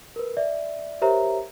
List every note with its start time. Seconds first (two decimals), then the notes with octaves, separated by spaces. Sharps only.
0.16 A#4 B4
0.37 D5 E5
1.02 G4 A#4 C5 C#5 E5 A#5